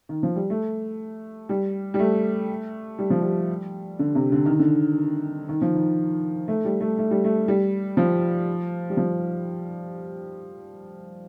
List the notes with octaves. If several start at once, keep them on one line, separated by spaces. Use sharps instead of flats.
D#3
F3
G3
A3
G3
G3
A3
G3
F3
G3
D3
C3
D3
D#3
D3
D#3
F3
D#3
A3
G3
A3
A3
G3
A3
G3
F3
G3
F3